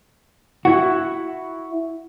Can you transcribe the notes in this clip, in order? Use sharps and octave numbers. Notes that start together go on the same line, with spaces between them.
E4 F#4